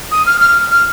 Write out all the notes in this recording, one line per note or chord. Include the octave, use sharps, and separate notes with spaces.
D#6
F6
F6
F6